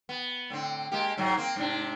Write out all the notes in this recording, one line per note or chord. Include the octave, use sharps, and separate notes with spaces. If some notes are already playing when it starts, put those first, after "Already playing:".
B3
A2 D3 C4
G#3 A#3 G4
G#2 F#3 G#3
A#3 C4
G#2 C3 D4